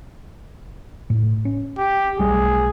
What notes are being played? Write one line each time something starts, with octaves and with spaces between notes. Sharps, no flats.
A2
C#4
G4
B1 G3 A3 G#4